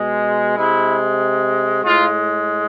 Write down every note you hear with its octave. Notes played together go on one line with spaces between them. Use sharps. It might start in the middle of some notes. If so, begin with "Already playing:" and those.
Already playing: B2 G#3
C3 G#3 E4
A2 G#3 F4